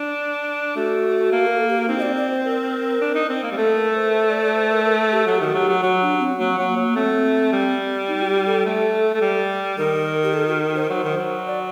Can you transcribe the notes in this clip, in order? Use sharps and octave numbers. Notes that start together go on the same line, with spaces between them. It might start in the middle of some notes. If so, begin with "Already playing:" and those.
Already playing: D4
A3 F#4
A#3
A#4
A4
G4
F#4
C4 D#4
D#5
D5
D5
C5
A#4
D4
D#4
C4
A#3
G3
A3 A4
A#4
C5
A#4
C5
D5
D5
C5
A#4
A#4
A4
G4
F#3 A4
G4
D#3 F#4
F#3 G4
F#3
F#3 F#4
D4
C4
F#3 A#3
F#3
F#3
A#3
A3 C4
G3
D#4
F#4
G4
A4
A3
A3
G3
D#3 A#4
G4
A4
F#4
C5
F#3
D#3
F#3
D5